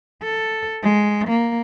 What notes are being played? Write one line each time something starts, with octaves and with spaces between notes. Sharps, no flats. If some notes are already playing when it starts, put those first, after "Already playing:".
A4
G#3
A#3